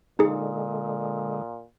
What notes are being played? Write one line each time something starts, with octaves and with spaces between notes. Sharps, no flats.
A#2 D3 G#3 D#4 G#4